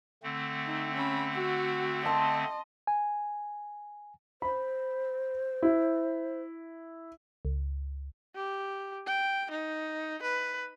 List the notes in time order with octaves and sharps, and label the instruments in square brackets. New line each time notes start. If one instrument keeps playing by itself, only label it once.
[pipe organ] D3 A3 C4
[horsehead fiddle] D#4
C#4 B5
F#4
[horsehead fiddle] D#5 [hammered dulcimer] A5 C6
[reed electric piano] G#5
[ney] C5 [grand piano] B5
[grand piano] E4
[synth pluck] C#2
[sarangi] G4
G5
D#4
B4